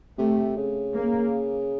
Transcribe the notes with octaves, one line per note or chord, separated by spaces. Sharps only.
C3 A3
C#3
A#3